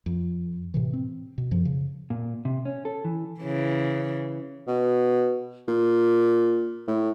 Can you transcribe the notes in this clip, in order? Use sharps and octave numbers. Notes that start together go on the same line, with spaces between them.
F2
A2 C3 E3
C4
B2
F#2 F3
C#3
A#2
C3
C#4
A4
E3
C#3 E3
B2
A#2
A2